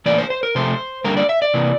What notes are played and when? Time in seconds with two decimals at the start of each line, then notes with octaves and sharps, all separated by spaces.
0.06 A2 E3 A#3 D5
0.18 C5
0.30 C5
0.43 A#4
0.55 C3 F3 A3 C5
1.04 D3 G3 A#3 A#4
1.17 D5
1.29 E5
1.42 D5
1.54 C3 E3 A#3